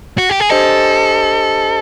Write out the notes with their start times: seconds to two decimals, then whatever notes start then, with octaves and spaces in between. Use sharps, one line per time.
0.18 F#4
0.30 G4
0.40 G#4
0.49 D4 G4 A4 C5 D#5 G#5